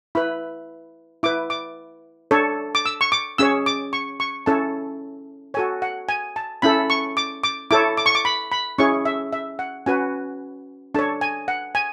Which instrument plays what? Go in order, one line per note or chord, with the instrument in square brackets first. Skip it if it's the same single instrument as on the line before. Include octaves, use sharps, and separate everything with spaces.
[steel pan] E4 B4 B5
E4 B4 D6
D6
D4 A4 C#5
D6
E6
C#6
D6
C#4 G#4 C#5 E6
D6
C#6
C#6
C#4 E4 A4 C#5 A5
F#4 A4 C#5 G#5
F#5
G#5
A5
C#4 E4 A4 B5
C#6
D6
D6
E4 A4 C#5 D6
D6
C#6
D6
B5
B5
C#4 E4 G#4 C#5 C#6
E5
E5
F#5
C#4 F#4 B4 G#5
D4 A4 C#5 A5
G#5
F#5
G#5